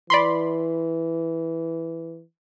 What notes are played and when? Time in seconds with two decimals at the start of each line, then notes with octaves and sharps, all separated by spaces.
0.10 E3 D5 B5 C6